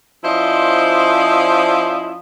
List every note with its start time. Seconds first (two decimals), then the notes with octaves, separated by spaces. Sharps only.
0.24 F3 C#4 E4 C5 D5 D#5